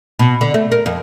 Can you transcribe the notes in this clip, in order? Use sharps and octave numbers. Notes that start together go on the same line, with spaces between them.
B2
D3
A3
A#4
F2